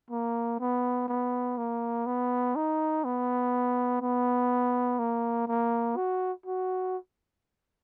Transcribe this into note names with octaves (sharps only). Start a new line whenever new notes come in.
A#3
B3
B3
A#3
B3
D#4
B3
B3
A#3
A#3
F#4
F#4